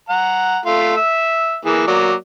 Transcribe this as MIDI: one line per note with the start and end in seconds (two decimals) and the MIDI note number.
0.09 0.58 78
0.09 0.58 82
0.66 0.96 57
0.66 0.96 65
0.97 1.56 76
1.65 1.84 52
1.65 1.84 58
1.65 1.84 68
1.87 2.14 54
1.87 2.14 58
1.87 2.14 74